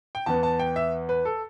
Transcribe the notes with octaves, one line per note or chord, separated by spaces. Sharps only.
G5
E2 E3 B3 A5
A5
G5
E5
B4
A4